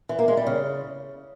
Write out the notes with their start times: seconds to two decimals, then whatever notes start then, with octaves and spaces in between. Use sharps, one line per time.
0.09 E3
0.19 A#3
0.28 G#3
0.37 G3
0.47 C#3